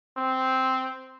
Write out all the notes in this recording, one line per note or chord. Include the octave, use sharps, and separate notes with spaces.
C4